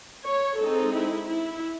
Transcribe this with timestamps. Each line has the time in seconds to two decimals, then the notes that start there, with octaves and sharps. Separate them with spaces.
0.25 C#5
0.59 G#3 C4 D#4 A4
0.94 E4
1.28 E4